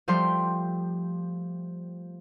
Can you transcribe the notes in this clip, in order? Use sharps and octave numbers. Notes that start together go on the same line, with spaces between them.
F3 G3 A3 G5 C6